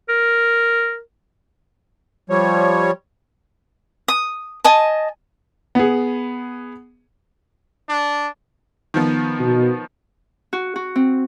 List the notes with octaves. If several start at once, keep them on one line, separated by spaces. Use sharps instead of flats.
A#4
F3 G3 C#5
D#6
D#5 G#5 A5
B3 G#4
D4
D#3 F3 B3
B2
F#4
F#4
C4